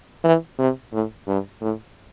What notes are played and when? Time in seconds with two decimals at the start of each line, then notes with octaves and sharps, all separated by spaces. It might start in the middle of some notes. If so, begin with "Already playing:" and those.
0.24 E3
0.59 C3
0.93 A2
1.27 G2
1.61 A2